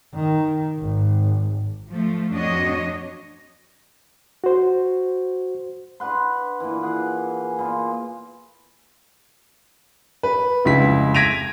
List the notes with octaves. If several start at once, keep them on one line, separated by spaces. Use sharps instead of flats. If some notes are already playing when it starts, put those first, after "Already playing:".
D#3
G#1
F3 A3
F2 D4 F#4 C#5 D#5
F#4 C5
D4 B4 F#5 C6
A#2 E3
G#4 F#5
G#5
A#2 B3 F4
B4
F1 C#2 E4 B6
G#6 A#6 B6 D7 D#7 F7